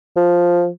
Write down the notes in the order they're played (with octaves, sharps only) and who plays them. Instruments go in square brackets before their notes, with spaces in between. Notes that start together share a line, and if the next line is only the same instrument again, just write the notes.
[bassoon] F3